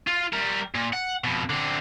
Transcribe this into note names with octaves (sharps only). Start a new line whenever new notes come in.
F4
G3 A#4
A#2
F#5
F2 B2
D3 C4